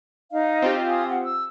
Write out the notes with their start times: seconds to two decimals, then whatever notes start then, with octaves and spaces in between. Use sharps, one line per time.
0.32 D#4 D#5 F5
0.62 C4 F4 G4
0.88 F5 G#5 D#6
1.08 F#5
1.23 E6